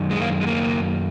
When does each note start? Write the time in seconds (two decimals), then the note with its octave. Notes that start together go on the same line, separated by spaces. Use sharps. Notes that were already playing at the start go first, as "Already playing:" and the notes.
Already playing: F#2 D#3
0.11 G#3
0.20 A#3
0.41 G#3
0.47 A#3